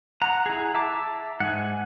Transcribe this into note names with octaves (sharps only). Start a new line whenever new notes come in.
F#5 A#5
E4 G#4
E5 A5 D6
G#2 F#5 G#5